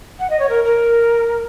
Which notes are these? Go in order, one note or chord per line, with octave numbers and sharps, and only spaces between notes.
F#5
D#5
C#5
A#4
A#4